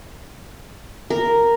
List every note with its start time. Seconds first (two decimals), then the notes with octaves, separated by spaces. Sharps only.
1.10 A#4